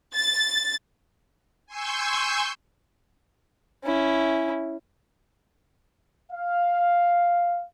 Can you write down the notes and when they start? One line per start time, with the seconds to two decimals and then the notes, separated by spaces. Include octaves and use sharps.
0.15 A6
1.66 G#5 C6 C#6 E6 G6
3.83 C#4 E4
6.32 F5